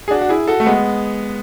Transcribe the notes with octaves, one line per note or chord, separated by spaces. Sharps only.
G#4
D4 F#4
F#4
E4 G#4
F#4 A4
A3
G#3 B3